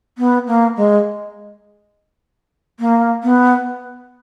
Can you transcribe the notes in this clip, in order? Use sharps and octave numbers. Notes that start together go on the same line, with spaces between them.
B3
A#3
G#3
A#3
B3